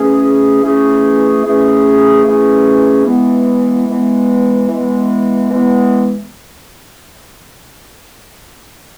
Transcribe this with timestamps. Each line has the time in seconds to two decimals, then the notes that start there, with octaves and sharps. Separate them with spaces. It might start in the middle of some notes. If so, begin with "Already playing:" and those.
Already playing: E3 A3 C#4 G#4
0.62 E3 A3 C#4 G#4
1.44 E3 A3 C#4 G#4
2.25 E3 A3 C#4 G#4
3.06 E3 G#3 B3
3.87 E3 G#3 B3
4.68 E3 G#3 B3
5.50 E3 G#3 B3